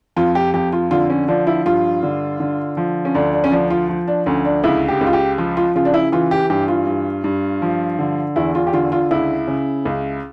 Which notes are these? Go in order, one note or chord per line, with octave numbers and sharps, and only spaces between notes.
F2 F4
G4
F2 G4
F4
D3 F4
C#4
F3 D4
E4
G2 F4
D3
D3
F3
C#4
D2 D4
D4
C#4
F3 D4
F4
F3
D4
D2 C#4
D4
C#2 E4
G4
C#2
F4
G4
F3 F4
F4
C#3 F4
D4
E4
E3 F4
G4
G2 G4
F4
G2
G2
F3
D3
E2 E4
F4
G4
D3 F4
F4
C#2 E4
C#3
C#2